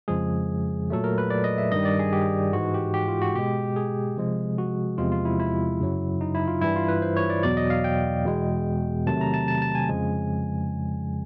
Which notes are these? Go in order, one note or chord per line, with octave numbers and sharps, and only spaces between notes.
F2 C#3 F3 G#3 G#4
A#2 F#3 A3 A4
A#4
B4
D5
D#5
E5
G2 D#3 G3 D#5
D5
G#4
G4
G#2 E3 G#3 F#4
G4
G4
F4
F#4
B2 G#3 G4
G#4
C3 F3 G#3
F#4
E2 C3 F3 G#3 F4
F4
E4
E4
F#2 C#3 F#3
D#4
E4
F4
G2 E3 G3 E4
F4
B4
C5
C#5
D5
E2 B2 F#3 D5
D#5
F5
G5
E2 B2 G#3
C3 D#3 F#3 A3 A5
A#5
A5
A5
A5
G#5
F2 C#3 F3 G#3